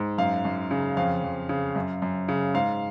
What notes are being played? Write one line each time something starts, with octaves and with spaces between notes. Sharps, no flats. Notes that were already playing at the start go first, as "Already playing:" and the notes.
Already playing: G#2
F#2 F5
F#2
C#3
F2 F5
F2
C#3
F#2
F#2
C#3
G#2 F5